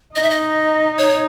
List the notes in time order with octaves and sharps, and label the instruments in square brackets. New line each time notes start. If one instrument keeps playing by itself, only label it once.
[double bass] D#4 [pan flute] D#5
[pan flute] E5
D#5
C#5